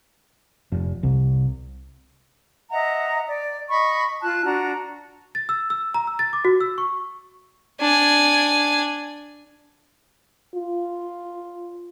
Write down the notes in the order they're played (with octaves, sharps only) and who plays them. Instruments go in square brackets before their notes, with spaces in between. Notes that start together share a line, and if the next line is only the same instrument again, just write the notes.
[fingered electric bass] F1
C2
[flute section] D#5 E5 F#5 A#5
D5
D#5 B5 C#6
F4 A5 F#6
D4 F#4 A#5
[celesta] A6
E6
E6
A#5
E6
A6
D6
F#4
E6
C#6
[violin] D4 G#5
[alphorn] F4